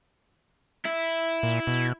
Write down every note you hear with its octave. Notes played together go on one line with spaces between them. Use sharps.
E4
A#2
B2